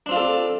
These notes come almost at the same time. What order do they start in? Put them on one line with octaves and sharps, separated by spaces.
D4 C4 F4 D5 A4